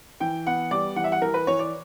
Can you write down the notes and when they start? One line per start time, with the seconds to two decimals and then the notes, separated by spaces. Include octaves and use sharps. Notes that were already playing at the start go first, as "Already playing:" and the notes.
0.20 E3 G5
0.47 B3 F#5
0.71 G3 D5
0.96 E3 F#5
1.04 E5
1.12 F#5
1.21 E3 A#4
1.34 B4
1.47 E3 C#5
1.59 D5